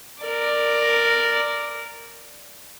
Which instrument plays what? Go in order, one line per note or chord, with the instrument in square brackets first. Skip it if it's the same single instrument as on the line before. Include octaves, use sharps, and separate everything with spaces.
[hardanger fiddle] A#4 D5